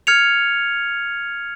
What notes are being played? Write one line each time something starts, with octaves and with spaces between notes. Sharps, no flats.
F6 G#6 C#7 F7